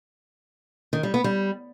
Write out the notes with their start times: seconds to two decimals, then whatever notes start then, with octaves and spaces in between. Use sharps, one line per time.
0.93 D#3
1.03 G3
1.14 B3
1.24 G3